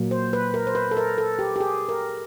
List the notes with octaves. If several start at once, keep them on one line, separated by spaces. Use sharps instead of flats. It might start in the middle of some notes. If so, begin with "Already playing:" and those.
Already playing: A#2 F#3 A#3
C5
B4
A#4
C5
B4
A4
A#4
A4
G4
G4
G#4
A#4